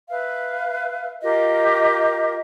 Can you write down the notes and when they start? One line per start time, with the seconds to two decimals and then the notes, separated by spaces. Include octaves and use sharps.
0.09 B4 E5 F5
1.23 F4 G4 A#4 D#5